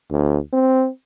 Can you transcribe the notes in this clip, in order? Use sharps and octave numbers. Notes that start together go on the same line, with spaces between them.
D2
C4